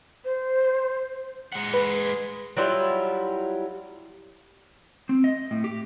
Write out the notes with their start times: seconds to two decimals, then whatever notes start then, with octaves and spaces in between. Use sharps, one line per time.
0.25 C5
1.53 G#3 F#5
1.74 B4
2.57 F#3 G3 E4 F4
5.09 C4
5.24 D#5
5.51 A2
5.64 G4